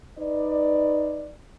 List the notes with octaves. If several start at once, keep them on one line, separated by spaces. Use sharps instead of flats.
D#4 B4 D5